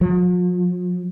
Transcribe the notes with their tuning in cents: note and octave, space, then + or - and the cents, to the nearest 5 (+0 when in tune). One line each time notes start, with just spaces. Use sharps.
F3 +45